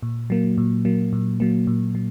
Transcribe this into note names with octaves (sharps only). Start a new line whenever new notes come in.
A#2
F#3 A#3
A#2
F#3 A#3
A#2
F#3 A#3
A#2
F#3